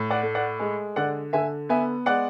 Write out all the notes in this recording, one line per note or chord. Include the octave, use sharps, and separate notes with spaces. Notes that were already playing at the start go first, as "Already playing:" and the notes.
Already playing: A2
D5 F#5
A3
D5 F#5
G#3
D3 D5 F#5
D3 E5 G#5
B3 E5 G#5
G#3 D5 F#5